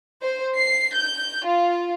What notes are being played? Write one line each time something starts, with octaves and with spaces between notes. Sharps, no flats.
C5
C7
G6
F4